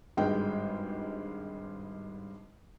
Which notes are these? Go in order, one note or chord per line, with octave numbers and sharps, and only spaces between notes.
G#1 G2 G#3 G5